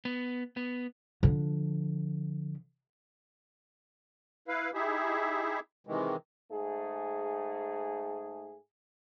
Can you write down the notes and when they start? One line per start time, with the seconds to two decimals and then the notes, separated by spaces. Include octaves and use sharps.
0.05 B3
0.57 B3
1.23 D3 F3
4.48 E4 B4 F5
4.74 D#4 E4 G4 G#4 E5
5.87 C3 D#3 E3 G#3
6.51 G#2 A3 G#4